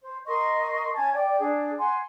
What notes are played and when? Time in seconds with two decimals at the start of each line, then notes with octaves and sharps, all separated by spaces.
0.02 C5
0.27 A#4 D#5 C6 C#6
0.96 C#4 G#5 A5 G#6
1.13 D5 G5
1.39 D4 G#4
1.78 F#5 G#5 C6